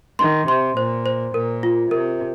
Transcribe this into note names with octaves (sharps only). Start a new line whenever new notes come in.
D#3 C6
C3 C6
A#2 C5
C5
A#2 A#4
F4
C3 A#4